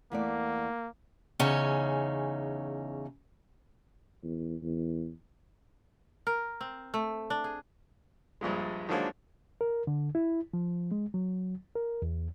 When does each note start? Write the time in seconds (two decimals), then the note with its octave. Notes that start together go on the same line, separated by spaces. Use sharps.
0.12 E2 A3 A#3 D5
1.39 E2 C#3 C#4 D#4 C#5 G#5
4.23 E2
4.62 E2
6.27 A#4
6.61 C4
6.94 A3
7.30 D4
7.44 G#4
8.41 A#1 G2 A#2 G#3
8.89 D#3 F3 F#3 G#3 A#3 D4
9.61 A#4
9.87 D3
10.15 E4
10.54 F3
10.92 G#3
11.14 F#3
11.75 A#4
12.02 E2